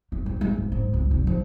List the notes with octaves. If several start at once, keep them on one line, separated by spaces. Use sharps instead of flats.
A3
G3
G#3
G#2
G#2
C#2
F1
F3